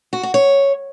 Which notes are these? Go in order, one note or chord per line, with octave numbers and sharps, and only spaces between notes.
F#4
F#4
C#5